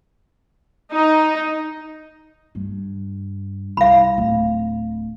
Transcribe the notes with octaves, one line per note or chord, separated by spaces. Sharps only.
D#4
G2
C2 F5 B5
D1